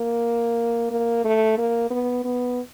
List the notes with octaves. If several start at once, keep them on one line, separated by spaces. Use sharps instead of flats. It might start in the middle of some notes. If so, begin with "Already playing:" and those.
Already playing: A#3
A#3
A3
A#3
B3
B3